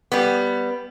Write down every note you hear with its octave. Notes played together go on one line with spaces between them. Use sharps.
G3 B3